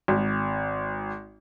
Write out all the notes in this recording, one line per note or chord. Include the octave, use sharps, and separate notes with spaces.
G#1